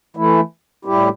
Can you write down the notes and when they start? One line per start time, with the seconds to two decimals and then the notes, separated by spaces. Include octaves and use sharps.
0.17 E3 A3 E4
0.85 A2 G3 E4 G4